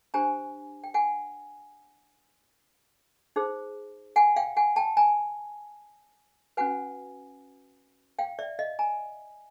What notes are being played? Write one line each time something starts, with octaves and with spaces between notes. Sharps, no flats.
D4 G4 C5 G#5 A#5
G5
F#5 G#5
D#4 G#4 C5
F#5 G#5
F5 G5
F#5 G#5
G5 A5
G#5 A#5
C#4 F#4 B4 F#5 G#5
F5 G5
D5 E5
D#5 F5
G#5 A#5